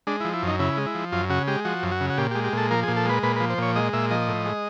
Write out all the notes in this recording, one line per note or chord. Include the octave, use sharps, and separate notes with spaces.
G#3 D4
E4
F3
E4
F#2 D#4
C#3 E4
G#3
E4
F3
F#2 F4
C#3 F#4
G#3 G4
F3 F#4
F#2
F#4
C#3
F#4
A#2 G4
G4
G#3
G4
A#2 A4
F3 A#4
G#4
A#2
A4
G#3 B4
A#2 B4
B4
F3
C5
A#2 C#5
G#3 D#5
A#2 E5
F3 D#5
A2
G#3